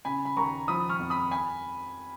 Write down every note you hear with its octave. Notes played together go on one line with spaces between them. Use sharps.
C#3 G#5 B5
B5
D#2 A#5 C#6
F3 B5 D#6
C#6 F6
F2
B5 D#6
G#5 B5